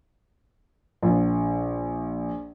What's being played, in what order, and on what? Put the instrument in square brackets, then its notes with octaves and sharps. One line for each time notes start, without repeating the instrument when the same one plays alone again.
[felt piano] A#1